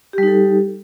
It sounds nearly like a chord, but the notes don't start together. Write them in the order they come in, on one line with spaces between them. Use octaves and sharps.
G4 G3 D#4 A4